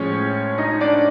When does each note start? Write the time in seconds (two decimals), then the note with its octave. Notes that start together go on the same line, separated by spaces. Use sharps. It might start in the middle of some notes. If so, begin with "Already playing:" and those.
Already playing: A2 F3 G#3 C#4 C#5
0.58 D#4 D#5
0.81 D4 D5